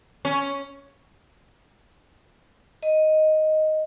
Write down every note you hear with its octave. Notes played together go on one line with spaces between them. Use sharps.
C#4
D#5